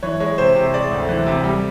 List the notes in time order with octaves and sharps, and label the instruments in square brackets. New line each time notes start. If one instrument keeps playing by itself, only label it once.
[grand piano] E3 C#5
G#3 C#5
C3 C5
C3
G#3 D5
D2
E3
C3
G3